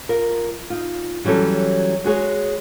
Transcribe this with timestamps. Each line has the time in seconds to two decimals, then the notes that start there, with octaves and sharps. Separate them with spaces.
0.09 F4 A#4
0.70 D#4 F4
1.24 E3 F#3 G3 C#4 A4
2.04 G#3 F#4 G#4 C#5